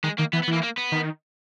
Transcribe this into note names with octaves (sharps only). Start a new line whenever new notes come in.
D#3 G#3
D#3 A#3
E3 B3
B3
E3
A#3
A#3
B3
D#3